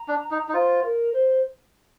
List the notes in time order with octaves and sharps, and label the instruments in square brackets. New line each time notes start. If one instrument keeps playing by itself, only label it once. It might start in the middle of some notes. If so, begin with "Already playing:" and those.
Already playing: [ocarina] A#5
[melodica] D4
D#4
D#4
[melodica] F4 [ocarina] C5
[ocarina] A#4
C5